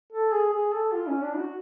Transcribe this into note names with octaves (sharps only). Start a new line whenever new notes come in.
A4
G#4
G#4
A4
F4
C#4
D4
F#4